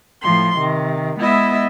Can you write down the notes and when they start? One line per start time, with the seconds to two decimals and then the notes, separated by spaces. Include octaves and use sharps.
0.21 A2 F3 C6
0.57 C3 D#3
1.18 G#3 B3 E4 D#5 E5